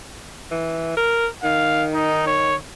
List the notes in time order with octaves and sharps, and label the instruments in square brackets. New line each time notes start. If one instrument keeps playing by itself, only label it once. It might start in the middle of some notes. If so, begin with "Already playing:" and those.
[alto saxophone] E3
A#4
[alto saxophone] D#3 [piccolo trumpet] F5
[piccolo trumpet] D#4
C#5